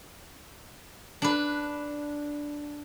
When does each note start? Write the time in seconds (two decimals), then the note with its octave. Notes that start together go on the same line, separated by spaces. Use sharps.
1.22 D4 B4